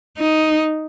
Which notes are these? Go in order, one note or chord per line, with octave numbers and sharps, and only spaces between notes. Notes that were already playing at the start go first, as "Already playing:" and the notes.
D#4